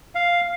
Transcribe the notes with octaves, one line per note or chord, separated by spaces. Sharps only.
F5